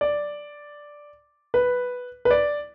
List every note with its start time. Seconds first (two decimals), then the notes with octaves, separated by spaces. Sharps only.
0.01 D5
1.54 B4
2.25 B4
2.31 D5